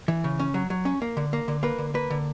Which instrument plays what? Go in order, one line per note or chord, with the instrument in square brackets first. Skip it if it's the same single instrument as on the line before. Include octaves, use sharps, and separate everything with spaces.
[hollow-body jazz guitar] E3
C#3
C#4
F#3
F#3
C#4
A#3
D3
A#3
D3
A#3 B4
D3
A#3 B4
D3